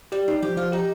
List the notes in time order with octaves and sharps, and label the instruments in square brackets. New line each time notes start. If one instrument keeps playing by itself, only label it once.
[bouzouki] G3 [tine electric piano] G4
[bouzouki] G3 [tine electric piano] D#4
[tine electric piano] F3 [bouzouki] G4
[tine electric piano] F3 [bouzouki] F4
[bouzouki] D#4 [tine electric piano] G4